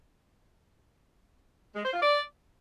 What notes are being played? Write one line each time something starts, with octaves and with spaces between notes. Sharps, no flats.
G#3
C5
F4
D5